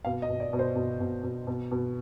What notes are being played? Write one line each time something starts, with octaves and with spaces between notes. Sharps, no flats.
B2 F5
D#5
B2
D5
B2
C5
B2
B2
B2
B2
B2